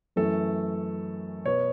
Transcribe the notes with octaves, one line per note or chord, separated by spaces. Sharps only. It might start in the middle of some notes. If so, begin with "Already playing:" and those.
F#2 E3 A3 A4
B2 B3 C#5